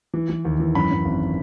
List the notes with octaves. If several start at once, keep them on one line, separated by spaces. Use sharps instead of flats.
E3
E3
D#2
E3
F#2 B5
F#2
G#1